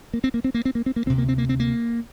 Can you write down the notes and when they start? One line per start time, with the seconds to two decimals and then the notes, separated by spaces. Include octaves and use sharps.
0.13 A#3
0.24 C4
0.34 A#3
0.44 C4
0.54 A#3
0.65 C4
0.75 A#3
0.86 C4
0.96 A#3
1.06 D2 C3 C4
1.18 A#3
1.29 C4
1.38 A#3
1.49 C4
1.60 A#3